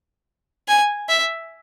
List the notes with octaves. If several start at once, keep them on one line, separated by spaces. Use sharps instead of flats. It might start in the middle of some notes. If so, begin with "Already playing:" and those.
G#5
E5